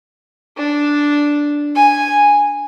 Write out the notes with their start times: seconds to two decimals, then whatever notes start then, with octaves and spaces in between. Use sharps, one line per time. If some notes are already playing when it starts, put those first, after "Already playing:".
0.57 D4
1.76 G#5